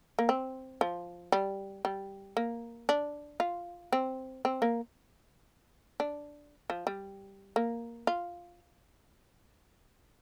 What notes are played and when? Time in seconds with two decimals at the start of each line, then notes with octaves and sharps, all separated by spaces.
0.19 A#3
0.29 C4
0.81 F3
1.32 G3
1.85 G3
2.37 A#3
2.89 D4
3.40 F4
3.92 C4
4.45 C4
4.62 A#3
6.00 D4
6.70 F3
6.87 G3
7.56 A#3
8.07 F4